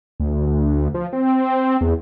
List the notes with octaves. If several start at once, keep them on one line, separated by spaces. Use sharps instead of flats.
D2
D2
F3
C4
E2